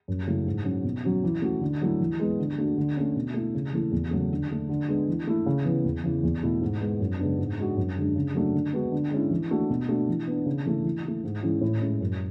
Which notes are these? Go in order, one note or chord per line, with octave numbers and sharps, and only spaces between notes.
F#2
C#3 F#3 A3 E4
G#2
F#3 C#4
B2
F#3 C#4 F#4
E3
A3 C#4 F#4
D3
F#3 A3 E4
E3
G#3 B3
D3
A3 D4 F#4
D3
A3 C#4
B2
A3 E4
C#3
E3 A3 E4
E2
C#3 F#3 A3
D3
A3 D4
D3
G#3 B3 D4
E3
A3 E4
C#3
E3 B3
E2
C#3 E3
E2
B2 A3 E4
G#2
G#3 B3
F#2
C#3 G#3 B3 D4
G#2
G#3 D4 F#4
F#2
D3 G#3 D4
C#3
F#3 A3 D4 F#4
D3
G#3 B3 D4 F#4
D3
G#3 C#4 E4
E3
A3 D4 F#4
B2
A3 D4 F#4
E3
B3 D4
C#3
E3 A3 E4
E3
A3 E4
G#2
E3 G#3 C#4 E4
A2
G#3 C#4 E4
F#2